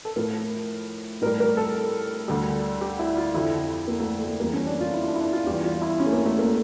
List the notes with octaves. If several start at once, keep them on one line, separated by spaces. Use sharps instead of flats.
A4
A2 F3 A#4
A2 G3 A#4
A#4
A4
D2 D3 G3
G4
E4
F4
F2 D3 F3 E4
A#3
A3
A3
E2 E3 G3 A#3
C#4
D4
F4
E4
D4
E4
D4
F4
E2 E3 G3 G4
F4
E4
C#4
A3
A#3
A3
A#3